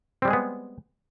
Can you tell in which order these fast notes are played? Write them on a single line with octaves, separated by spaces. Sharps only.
C4 G3 G#3 G#4 B3